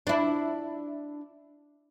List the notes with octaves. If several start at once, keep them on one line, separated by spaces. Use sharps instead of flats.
D4 E4